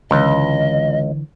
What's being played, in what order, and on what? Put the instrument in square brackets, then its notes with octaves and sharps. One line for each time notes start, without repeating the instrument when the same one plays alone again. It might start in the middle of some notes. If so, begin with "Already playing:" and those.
[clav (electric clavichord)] C#2 [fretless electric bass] D3 E3 [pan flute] D#5